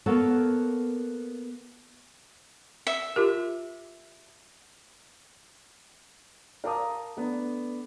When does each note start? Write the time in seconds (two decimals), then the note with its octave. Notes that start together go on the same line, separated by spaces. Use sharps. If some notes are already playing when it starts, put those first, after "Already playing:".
0.06 A#3 B3 F#4 A4 A#4 C#5
2.87 E5
3.16 F4 G4 A#4
6.64 A#4 F5 A5 A#5 D6 D#6
7.17 A3 B3 D4